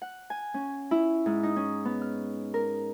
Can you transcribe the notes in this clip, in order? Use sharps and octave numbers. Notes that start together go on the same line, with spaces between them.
F#5
G#5
C#4
E4
G#2
D#4
C#4
B3
F6
A#4